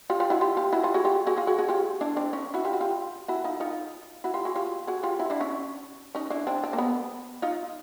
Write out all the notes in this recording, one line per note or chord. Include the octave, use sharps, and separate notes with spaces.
F4 G4
F4 G4
E4 F#4
F4 G4
F4 G4
E4 F#4
F4 G4
F#4 G#4
F4 G4
F#4 G#4
F4 G4
F#4 G#4
F#4 G#4
F4 G4
D4 E4
C4 D4
C#4 D#4
E4 F#4
F4 G4
F#4
F4 G4
E4 F#4
D#4 F4
D#4 F4
E4 F#4
F4 G4
F#4 G#4
F4 G4
F#4 G#4
F4 G4
E4 F#4
D4 E4
C#4 D#4
C#4 D#4
D4 E4
C4 D4
C4
A#3
B3
D#4 F4